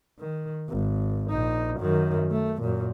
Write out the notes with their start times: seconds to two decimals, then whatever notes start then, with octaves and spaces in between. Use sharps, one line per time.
0.19 D#3
0.69 G#1
1.30 A#1 D#4
1.79 F#2 D#3
2.31 A3
2.62 F#2 A#2